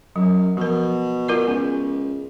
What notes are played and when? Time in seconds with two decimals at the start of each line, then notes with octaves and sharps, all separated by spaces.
0.16 F#2 F#3
0.57 B2 F3 A#4
1.28 F4 A#4 D5
1.47 C#2 B3